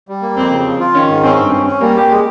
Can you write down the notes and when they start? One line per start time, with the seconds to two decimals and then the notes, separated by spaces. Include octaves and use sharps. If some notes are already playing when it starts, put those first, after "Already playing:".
0.08 G3
0.22 A#3
0.36 F2 C4
0.51 C#3
0.65 F3
0.80 F4
0.94 D#3 C#4
1.09 G#2
1.23 C4 C#4
1.38 G2
1.52 C#4
1.66 C#4
1.81 G3 A#3
1.96 G4
2.11 G#3